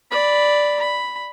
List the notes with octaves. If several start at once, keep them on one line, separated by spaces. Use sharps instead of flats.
D5 B5
B5